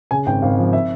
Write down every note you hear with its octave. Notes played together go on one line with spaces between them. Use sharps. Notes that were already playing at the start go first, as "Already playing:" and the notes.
C#3 G#5
G#1 G5
G#1 F5
F3
E5